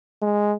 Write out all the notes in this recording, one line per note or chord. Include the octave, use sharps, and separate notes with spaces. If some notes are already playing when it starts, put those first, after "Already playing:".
G#3